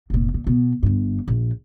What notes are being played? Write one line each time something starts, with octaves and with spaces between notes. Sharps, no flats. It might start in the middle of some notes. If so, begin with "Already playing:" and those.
F1 A#2
A#2
B2
G1 G2
A#1